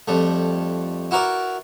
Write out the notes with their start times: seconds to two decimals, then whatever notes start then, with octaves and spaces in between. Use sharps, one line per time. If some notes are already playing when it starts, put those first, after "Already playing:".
0.08 F2 G3 A3
1.11 E4 F#4 A#4 B4 D5